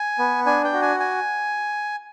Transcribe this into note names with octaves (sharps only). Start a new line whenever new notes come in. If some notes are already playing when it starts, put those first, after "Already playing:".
Already playing: G#5
B3
D4 G#5
G5
F#4
G#5
G#5